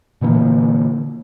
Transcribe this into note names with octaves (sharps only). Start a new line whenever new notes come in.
A#2 D3 E3 A#3